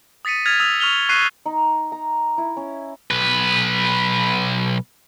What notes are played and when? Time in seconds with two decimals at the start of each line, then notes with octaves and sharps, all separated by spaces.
0.25 D#6 A6 B6 C#7 D#7
0.46 D#6 F6 G#6 A6 B6 F7
0.60 D#6 E6 B6 F7
0.80 C#6 F6 F7 G7
1.09 C#6 F#6 B6 C7 D#7 G7
1.46 D#4
1.92 A#5
2.38 E4
2.57 C#4
3.11 B1 B4